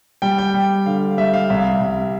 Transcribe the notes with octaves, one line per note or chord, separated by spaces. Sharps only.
G3 G5
G5
G3
D3 F5
G3 E5
F5
C2 E5
C2